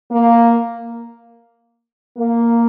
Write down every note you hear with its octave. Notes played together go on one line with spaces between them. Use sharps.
A#3
A#3